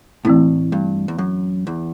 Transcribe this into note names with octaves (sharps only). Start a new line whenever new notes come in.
A2 E3 A3 C4 E4
G2
E2
F#2
E2